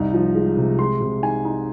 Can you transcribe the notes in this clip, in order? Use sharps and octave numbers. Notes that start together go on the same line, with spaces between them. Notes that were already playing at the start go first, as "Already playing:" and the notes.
Already playing: C2 D#4
F3
G#3
C3
G#3 C6
C3
D#4 G#5
D#4